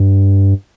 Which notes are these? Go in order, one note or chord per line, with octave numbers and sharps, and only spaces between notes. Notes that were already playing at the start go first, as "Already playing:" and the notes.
Already playing: G2